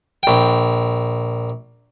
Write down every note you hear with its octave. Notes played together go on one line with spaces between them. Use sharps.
A#1 G5